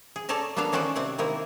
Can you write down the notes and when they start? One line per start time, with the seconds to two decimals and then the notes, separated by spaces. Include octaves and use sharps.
0.16 G#4
0.29 A4 C#5 D5 A5 A#5
0.56 A#3 B3 D4 A4 F5
0.72 D#3 C#4 F#4 A4 C5 D5
0.95 C3 C4 D5 F#5
1.18 D#3 A#3 C4 E4